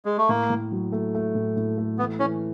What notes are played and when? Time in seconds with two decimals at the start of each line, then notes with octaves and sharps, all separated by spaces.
0.05 G#3
0.18 A3
0.29 A2 A#3
0.50 A2
0.72 F#3
0.92 A3
1.15 A3
1.35 A2
1.57 A2
1.78 A3
1.99 E3 B3
2.19 E3 C#4